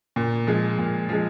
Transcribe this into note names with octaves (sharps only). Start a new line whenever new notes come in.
A#2
F3 G#3
A#2
F3 G#3